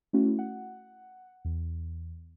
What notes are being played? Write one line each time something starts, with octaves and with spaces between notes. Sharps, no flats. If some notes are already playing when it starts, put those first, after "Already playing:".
A3 C#4 E4 F#4
F#5
E2